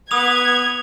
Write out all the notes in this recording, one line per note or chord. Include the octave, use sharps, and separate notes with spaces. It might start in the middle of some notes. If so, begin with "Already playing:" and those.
B3 D#6 G#6 F7